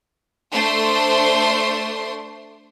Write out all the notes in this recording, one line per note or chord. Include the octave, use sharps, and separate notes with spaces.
A3 D4 C5 C6